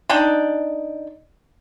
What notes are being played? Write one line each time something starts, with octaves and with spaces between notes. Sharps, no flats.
D4 D#4 D5 G5